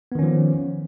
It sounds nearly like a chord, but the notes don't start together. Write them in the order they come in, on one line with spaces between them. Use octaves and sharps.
B3 D#3 C#4 F3